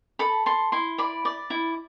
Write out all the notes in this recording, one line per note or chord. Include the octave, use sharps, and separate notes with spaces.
A4 B5
A4 C6
E4 C6
D5 B5
D5
E4